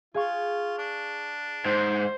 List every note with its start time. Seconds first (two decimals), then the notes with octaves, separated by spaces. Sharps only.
0.14 F4 G#4 F5 C#6
0.78 D4
1.65 G#2 C5